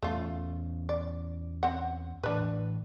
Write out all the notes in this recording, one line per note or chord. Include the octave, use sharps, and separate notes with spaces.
E2 A3 C#4 F4
D5
C4 F#5
A2 E3 D4 B4